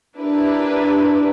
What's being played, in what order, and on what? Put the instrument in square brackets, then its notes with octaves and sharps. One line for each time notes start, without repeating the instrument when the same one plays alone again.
[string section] D4 E4 G4 A#4 B4